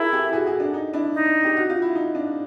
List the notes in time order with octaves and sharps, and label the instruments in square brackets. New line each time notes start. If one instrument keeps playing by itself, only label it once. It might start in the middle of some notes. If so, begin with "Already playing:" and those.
Already playing: [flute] E4 [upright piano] G#4 A#4
[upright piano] G4 A4
F#4 G#4
F#4 G#4
D4
D#4
D4 E4
[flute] D#4
[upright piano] G4
F#4
F4
E4
D#4
D4